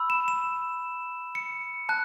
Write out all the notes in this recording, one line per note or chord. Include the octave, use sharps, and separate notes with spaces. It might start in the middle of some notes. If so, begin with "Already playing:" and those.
Already playing: B5 E6
E7
E7
C#7
A5 F#6